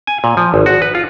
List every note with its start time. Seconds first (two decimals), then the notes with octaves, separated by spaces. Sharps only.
0.07 G#5
0.24 A#2
0.37 F3
0.54 G#1
0.66 F#4
0.82 B4
0.95 F4